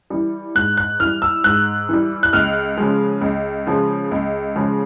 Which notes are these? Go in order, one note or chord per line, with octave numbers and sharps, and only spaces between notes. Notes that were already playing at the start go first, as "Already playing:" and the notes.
E3 G3
G#2 F#6
F#6
E3 G3 F6
E6
G#2 F#6
E3 G3
F#6
C#2 F6
C#3 F3 G#3
C#2
C#3 F3 G#3
C#2
C#3 F3 G#3